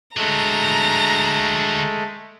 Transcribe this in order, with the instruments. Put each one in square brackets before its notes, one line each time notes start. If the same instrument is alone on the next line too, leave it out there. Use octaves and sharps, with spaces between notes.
[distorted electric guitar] D3 F#3 [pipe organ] G#3 A3 [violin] A#5